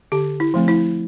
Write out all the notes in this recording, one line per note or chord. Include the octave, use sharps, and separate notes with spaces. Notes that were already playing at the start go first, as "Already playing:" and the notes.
D3 G4
E4
F3 A3 C4
E4